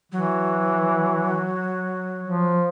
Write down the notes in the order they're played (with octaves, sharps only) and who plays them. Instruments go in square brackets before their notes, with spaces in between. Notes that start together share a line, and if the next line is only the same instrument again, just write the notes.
[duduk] E3 [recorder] F#3
[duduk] F3